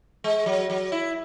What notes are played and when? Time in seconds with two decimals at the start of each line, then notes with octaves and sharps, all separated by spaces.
0.24 G#3
0.46 F#3
0.70 F#3
0.92 E4